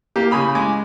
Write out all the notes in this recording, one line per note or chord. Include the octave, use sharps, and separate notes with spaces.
A#3 G4
C#3 G#5 B5 D#6
G#3 G#5 D6